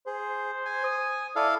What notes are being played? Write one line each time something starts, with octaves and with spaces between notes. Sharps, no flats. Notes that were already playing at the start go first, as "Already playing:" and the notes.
G#4 C5
G#5
D#6
E4 A4 D5 F5